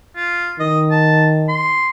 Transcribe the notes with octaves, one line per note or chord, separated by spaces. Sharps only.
F4
D#3 D#5
A5
C6